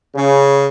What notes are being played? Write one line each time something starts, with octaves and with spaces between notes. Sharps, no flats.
C#3